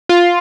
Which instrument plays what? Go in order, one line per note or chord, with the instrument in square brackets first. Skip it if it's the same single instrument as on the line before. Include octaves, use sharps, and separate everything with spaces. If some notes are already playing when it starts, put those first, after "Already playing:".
[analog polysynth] F4